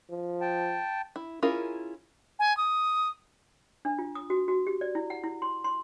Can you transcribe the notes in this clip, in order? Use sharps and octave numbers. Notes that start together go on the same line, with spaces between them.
F3
G5 A5
E4
C#4 E4 F4 G#4 A#4
G#5
D#6
D4
F4
D#6
F#4
F#4
G4
D5
E4
F#5
E4
C6
C6